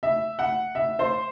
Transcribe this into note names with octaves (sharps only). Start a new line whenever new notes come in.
E5
F#5
E5
C5